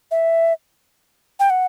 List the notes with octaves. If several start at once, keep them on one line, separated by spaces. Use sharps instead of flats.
E5
G5
F#5